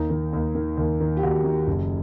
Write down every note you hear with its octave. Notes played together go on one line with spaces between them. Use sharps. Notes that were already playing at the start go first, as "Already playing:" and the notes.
Already playing: D#2 D#4
D#3
D#2 D#4
D#3
D#2
D#3
G4
D#2 F#4
D#3
F#1